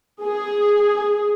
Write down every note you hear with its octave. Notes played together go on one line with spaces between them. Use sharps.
G#4